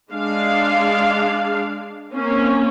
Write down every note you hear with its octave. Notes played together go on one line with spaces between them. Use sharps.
G#3 D4 F5
A#3 C4 C#4